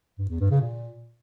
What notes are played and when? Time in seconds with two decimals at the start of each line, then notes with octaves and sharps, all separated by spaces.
0.19 G2
0.29 E2
0.40 G2
0.51 C#3
0.61 A#2